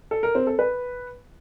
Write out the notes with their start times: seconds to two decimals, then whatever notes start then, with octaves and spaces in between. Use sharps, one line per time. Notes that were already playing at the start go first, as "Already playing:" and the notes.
0.11 A4
0.23 A#4
0.35 C4
0.47 A4
0.59 B4